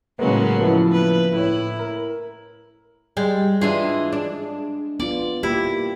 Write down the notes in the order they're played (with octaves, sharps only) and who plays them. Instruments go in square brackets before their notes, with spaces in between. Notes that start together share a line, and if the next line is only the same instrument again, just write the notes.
[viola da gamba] A2 C#3 F#3 [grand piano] G#3 A#3 B3
[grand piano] F3 B3 E4
[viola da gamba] A#3 B4
[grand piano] A2 C#5 [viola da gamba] E4
[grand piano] A#4
[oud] G3 [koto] G#3
[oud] E3 D4 F4 [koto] G#4
[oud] D4
[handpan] B3 F4 [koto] D5
[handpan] A#3 G4 [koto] E4